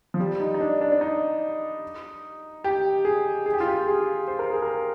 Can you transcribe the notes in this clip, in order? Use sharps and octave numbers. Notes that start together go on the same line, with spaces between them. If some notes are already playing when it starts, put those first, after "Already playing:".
F3
G3
D#4
D#4
D4
D4
D4
D#4
G4
G#4
G#4
G4
F4
G4
G#4
C5
A#4
G#4
A#4